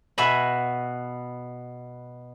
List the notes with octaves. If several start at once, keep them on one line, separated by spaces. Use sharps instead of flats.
B2 F#4 E5 G#5 B5